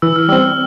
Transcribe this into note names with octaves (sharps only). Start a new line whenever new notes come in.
E3 E6
F6
G3 C4 E6